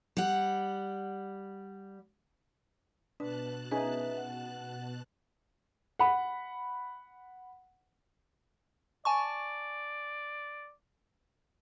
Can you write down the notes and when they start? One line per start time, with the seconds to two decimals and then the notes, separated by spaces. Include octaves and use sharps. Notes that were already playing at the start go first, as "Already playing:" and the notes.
0.17 G3 F#5
3.20 B2 D4 B4 A5 F#6
3.71 C#4 D#4 G#4 B4 E5
4.17 F#5
5.99 F#5 B5
9.05 D5 G#5 A5 C#6